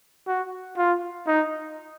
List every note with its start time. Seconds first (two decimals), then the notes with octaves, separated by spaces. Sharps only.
0.27 F#4
0.78 F4
1.27 D#4